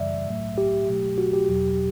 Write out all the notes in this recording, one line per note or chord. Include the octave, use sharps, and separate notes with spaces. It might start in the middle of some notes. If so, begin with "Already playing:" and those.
Already playing: F#2 C#3 E3 G3 D5 E5
A2 F#3 A3
G4
B2 F#3 A3
F#4
G4
E2 B2 F#3